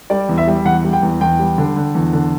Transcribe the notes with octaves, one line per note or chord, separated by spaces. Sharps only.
G3 D5
E2
E5
G3
E2 F#5
G3
G5
E2
E2 G5
G3
D3
D3
E2
D3